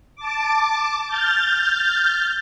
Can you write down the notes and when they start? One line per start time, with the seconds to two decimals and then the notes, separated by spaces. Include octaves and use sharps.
0.16 A5 D6
1.06 F6 G6 A6